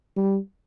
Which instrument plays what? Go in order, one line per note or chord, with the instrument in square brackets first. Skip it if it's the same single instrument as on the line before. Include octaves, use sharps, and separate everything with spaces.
[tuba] G3